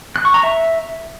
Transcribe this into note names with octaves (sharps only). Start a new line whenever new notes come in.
F#6
C#6
A#5
E5